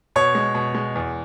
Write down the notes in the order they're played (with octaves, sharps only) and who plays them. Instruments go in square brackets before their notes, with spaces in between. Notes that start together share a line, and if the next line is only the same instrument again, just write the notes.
[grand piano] B2 C#5
G#3
B2
G#3
E2